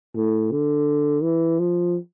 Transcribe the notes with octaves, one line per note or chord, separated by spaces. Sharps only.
A2
D3
E3
F3